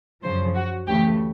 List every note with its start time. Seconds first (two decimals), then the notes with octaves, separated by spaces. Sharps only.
0.23 F#2 C#3 F3 C5
0.55 F#4
0.87 D2 C#3 E3 A3 G4